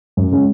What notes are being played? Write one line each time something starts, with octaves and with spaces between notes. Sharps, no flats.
F#2
C#3 G#3 C#4